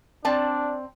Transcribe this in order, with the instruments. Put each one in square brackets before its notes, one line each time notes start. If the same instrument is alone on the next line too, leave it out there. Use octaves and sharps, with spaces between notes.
[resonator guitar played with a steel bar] C4 D5 A5 [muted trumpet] D4